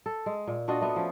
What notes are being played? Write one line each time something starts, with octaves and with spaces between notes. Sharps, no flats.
A4
G#3
A#2
D4 F4 F#4 D#5
A3 B3
F3 C#4